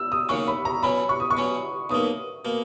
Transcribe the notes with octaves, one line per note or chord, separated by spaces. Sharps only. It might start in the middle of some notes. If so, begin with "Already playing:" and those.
Already playing: E6
D#6
D#2 C#3 F#3 C#4 C#6
B5
A#5
B2 F#3 C#4 B5
C#6
D#6
C#6
B2 F#3 C#4
B1 B2 A#3 D#6
B2 A#3